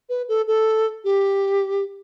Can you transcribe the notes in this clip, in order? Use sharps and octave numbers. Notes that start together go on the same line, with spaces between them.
B4
A4
A4
G4